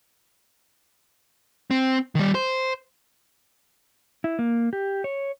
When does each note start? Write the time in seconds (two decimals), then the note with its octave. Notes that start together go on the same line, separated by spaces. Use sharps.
1.71 C4
2.15 D#3 G3
2.35 C5
4.24 E4
4.39 A#3
4.73 G4
5.04 C#5